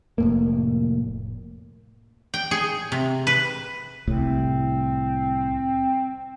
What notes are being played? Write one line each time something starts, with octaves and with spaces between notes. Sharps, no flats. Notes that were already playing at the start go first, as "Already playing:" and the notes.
F1 A2 A#3
G5
G#4
C3
B4
C2 A2 C4